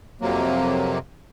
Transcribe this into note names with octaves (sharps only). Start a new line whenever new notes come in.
F2 C3 F#3 A#3